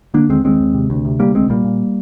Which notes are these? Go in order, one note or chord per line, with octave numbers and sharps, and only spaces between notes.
D3 A#3 D4
D#2 G#3 C4
D#2 G#3 C4
D#2
C3
D2
C3
D2 G3 A#3
C2 G#3 C4
A#2 G3 A#3
A#2